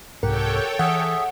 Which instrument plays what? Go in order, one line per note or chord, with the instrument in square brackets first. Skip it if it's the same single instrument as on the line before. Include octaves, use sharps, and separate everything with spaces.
[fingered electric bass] C2 G#2 [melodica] G4 F#5 [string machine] A4 C#5 G5 [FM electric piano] A#4
[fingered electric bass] E3 [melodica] G#4 E5 [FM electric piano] F#5